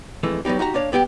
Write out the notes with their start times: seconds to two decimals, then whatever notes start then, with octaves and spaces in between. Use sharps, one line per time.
0.23 F2 E3 G#3 A3
0.45 F#3 G3 B3 D#4 G4
0.59 D#4 F#4 G4 A#5
0.74 A#3 D4 C#5 F5
0.92 G2 B3 G4 G#4 G5